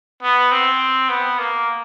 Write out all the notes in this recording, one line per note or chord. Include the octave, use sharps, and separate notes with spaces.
B3
C4
B3
A#3